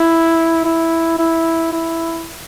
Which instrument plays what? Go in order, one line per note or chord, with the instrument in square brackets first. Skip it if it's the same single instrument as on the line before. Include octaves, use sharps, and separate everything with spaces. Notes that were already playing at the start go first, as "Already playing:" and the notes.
Already playing: [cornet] E4
E4
E4
E4